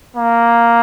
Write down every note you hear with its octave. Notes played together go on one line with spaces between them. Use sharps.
A#3